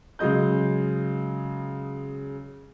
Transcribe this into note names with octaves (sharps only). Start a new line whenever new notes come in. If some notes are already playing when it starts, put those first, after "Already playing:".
C#3 F#3 G#3 D#5 G6